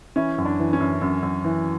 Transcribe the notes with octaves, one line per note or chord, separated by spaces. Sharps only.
E3 C#4 E4
F#2
D4
E3
C#4
F#2
F#2
F#2
E3